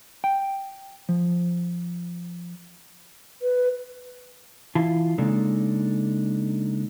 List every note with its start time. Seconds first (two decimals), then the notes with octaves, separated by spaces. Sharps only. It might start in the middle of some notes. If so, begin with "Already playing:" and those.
0.24 G5
1.09 F3
3.42 B4
4.75 E3 E4 F4 A5
5.18 C#3 G#3 A#3 D4 D#4 A4